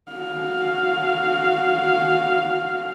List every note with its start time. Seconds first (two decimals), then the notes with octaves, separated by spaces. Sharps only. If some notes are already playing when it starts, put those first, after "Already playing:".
0.12 F#4 F5